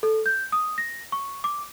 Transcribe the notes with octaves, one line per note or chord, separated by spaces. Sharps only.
A4
G6
D#6
A#6
C#6
D6